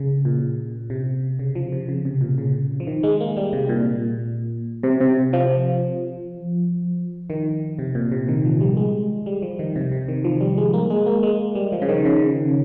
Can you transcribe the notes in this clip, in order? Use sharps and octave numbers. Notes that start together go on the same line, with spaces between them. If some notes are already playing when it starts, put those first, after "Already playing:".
Already playing: C#3
A#2
C3
C#3
F3
C3
C#3
C3
A#2
C#3
F3
D#3
G#3
A#3
G3
C3
A#2
C3
C3
F3
D#3
C3
A#2
C3
D#3
F3
G3
G#3
G3
F3
D#3
C3
C3
D#3
F3
G3
G#3
A#3
G#3
A#3
G#3
G3
F3
C#3
D#3
C#3